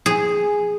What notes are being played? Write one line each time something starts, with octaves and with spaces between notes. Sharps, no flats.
G#4